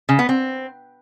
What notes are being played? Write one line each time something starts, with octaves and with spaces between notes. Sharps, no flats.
C#3
B3
C4